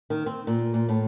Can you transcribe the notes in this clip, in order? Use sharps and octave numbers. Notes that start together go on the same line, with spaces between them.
D#3
C4
A#2
A#2
A2